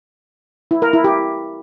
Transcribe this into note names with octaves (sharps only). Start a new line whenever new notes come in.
E4
A#4
E4
G4